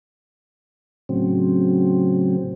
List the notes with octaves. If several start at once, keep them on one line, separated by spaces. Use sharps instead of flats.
A2 C#3 F#3 C4